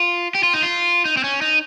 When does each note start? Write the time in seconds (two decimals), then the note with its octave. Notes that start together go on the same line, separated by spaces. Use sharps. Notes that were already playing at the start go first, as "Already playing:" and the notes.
Already playing: F4
0.35 G4
0.43 F4
0.54 D#4
0.63 F4
1.05 D#4
1.17 C4
1.24 C#4
1.42 D#4